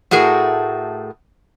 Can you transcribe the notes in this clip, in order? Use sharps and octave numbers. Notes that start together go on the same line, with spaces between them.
A2 A3 F#4 G#4 A#4